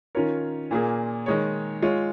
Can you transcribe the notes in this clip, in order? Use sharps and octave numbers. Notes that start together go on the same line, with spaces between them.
D#3 C#4 F4 A#4 C#5
A#2 A#3 F4 G#4
D#3 G#3 D#4 C#5
G#3 F4 C#5